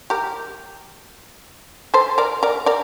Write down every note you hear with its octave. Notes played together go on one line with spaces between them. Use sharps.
G4 A#4
A4 C5
A#4 D5
A#4 D5
A#4 D5